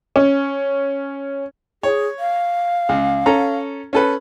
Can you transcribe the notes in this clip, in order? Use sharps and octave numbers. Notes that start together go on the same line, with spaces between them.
C#4
G#4 C#5
F5
C#2
C#4 A4 A#5
C#4 A4 B4